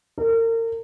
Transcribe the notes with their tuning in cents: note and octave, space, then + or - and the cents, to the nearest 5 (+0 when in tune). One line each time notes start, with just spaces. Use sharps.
A#4 -35